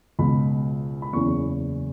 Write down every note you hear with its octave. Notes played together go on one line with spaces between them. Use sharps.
C#2 B2 B5
B5
F#1 E2 C#3 C#6